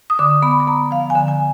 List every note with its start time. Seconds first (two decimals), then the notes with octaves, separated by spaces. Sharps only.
0.10 D#6
0.19 D3 D6
0.42 B3 B5
0.60 B5
0.67 B3 A#5
0.91 F3 F5
1.10 G#5
1.15 D3
1.28 G#5